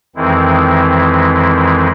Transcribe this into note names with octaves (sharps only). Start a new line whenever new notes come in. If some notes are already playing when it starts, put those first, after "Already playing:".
F2 D#3 E3 G#3 C4 E4